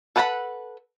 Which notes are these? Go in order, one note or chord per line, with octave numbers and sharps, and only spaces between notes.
A4 B4 F#5 A5 B5